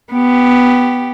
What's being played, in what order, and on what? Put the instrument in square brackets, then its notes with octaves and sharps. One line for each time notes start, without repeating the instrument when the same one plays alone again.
[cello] B3 G4